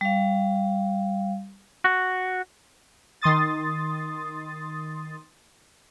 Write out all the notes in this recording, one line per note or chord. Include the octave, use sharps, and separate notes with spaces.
G3 F5
F#4
D#3 C6 D#6 A6